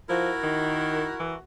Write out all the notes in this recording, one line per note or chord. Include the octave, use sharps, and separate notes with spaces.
F3 E4 F#4 A#4
D#3
E3